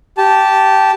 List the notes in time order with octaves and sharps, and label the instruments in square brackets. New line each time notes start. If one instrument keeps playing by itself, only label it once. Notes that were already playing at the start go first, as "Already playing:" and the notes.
[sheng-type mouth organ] G4 A5